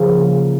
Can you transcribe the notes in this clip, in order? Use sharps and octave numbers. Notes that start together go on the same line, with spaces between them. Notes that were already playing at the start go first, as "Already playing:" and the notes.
Already playing: C#3 F3 A#3 C#4 A#4